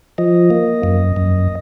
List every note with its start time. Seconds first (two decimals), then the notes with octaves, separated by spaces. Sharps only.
0.18 F3 D#5
0.50 A#3
0.83 F#2
1.16 F#2